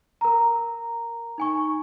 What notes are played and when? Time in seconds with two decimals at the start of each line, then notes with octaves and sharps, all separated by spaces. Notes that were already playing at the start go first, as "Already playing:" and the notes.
0.21 A#4 A#5
1.38 D#4 G#5 C#6